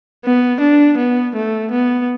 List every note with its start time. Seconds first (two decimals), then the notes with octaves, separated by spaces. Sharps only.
0.25 B3
0.61 D4
0.98 B3
1.35 A3
1.72 B3